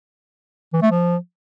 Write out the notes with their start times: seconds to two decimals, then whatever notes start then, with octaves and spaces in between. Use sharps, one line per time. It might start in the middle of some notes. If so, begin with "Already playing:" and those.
0.73 E3
0.82 A3
0.91 F3